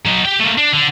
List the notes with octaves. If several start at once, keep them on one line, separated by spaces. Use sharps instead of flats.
F#3 D#4
G4 G5
A3 A#3
D4
D3